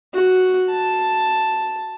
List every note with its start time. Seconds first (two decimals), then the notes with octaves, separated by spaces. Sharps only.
0.14 F#4
0.70 A5